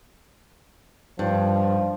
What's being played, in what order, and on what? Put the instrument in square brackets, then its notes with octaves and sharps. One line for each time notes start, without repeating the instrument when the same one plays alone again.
[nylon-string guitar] G2 [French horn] F3